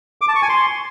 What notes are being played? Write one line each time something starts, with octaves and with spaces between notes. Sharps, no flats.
D6
A5
C#6
G#5
C6